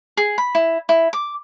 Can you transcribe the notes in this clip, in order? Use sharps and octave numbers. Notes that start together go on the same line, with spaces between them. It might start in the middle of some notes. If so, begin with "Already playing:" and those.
G#4
B5
E4
E4
D6